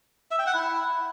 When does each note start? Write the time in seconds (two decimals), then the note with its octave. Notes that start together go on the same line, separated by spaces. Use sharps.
0.31 E5
0.39 G5
0.46 F#5
0.54 E4